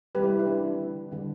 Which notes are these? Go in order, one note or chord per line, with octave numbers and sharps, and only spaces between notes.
E3 G3 C4 G4 B4
E4
E4
E3 G3 C4 D4
D3 G3 C4
D3 G3 C4